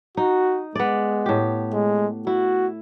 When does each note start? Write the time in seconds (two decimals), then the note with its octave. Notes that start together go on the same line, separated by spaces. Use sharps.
0.17 D#4 F#4
0.75 G#3 B3 D5
1.26 A2 G4
1.74 G#3
2.27 E4 F#4